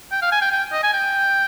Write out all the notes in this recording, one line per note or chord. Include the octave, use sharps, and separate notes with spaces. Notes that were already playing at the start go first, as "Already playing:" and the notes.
G5
F5
G#5
G5
G5
D#5
G#5
G5